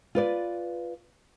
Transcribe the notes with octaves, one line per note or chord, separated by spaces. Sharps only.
F4 B4 D5